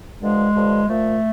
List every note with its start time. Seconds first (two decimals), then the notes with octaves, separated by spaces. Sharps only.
0.20 G2 D3 F3 G#3
0.55 G2 D3 F3
0.89 A#2 F3 A3